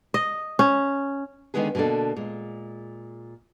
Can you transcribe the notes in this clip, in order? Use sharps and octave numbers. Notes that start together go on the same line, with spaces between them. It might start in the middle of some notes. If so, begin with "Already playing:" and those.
D#5
C#4
D3 D#3 F3 G#3 B3 G#4
B2 D3 A#3 D4 A4
A#2 G#3